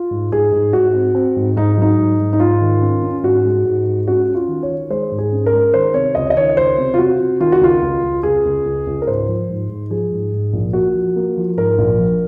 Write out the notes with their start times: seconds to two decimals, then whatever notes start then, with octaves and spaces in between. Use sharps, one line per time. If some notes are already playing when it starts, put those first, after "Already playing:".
Already playing: F4
0.11 G#2
0.31 G#2 G#4
0.52 G#2
0.73 G#2 F#4
0.94 C4
1.15 C4
1.36 G#2
1.56 G#2 D#4
1.77 F#3 D#4
1.98 G#2
2.20 G#2
2.33 D#4
2.40 G#2 F4
2.61 D#3
2.82 C#4
3.02 C#4
3.23 G#2 F#4
3.45 G#3
3.65 G#2
3.86 G#3
4.07 C#4 F#4
4.28 C#4
4.35 F4
4.48 D#3
4.63 C#5
4.69 D#3
4.90 G#3 C5
5.11 G#2
5.18 G#4
5.32 C#4
5.46 A#4
5.53 G#3
5.74 D#3 C5
5.94 C3 C#5
6.15 C#2 D#5
6.30 D#5
6.36 D#3 C#5
6.57 C#2 C5
6.78 C3
6.94 F4
6.98 C3 F#4
7.20 C3
7.40 D#3 F4
7.52 F#4
7.61 C#2 F4
7.82 C#2
8.02 C#2
8.23 C#2 G#4
8.45 C#2
8.65 C#2
8.87 C#2
9.02 A#4
9.07 G#2 C5
9.28 F3
9.49 G#2
9.69 G#2
9.90 F3 G#4
10.12 G#2
10.32 G#2
10.53 A#1
10.73 A#3 F#4
10.94 F3
11.16 A#3
11.37 F3
11.57 G#2 A#4
11.78 A#1
11.98 F3